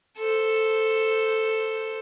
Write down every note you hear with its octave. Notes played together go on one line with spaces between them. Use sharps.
A4 C5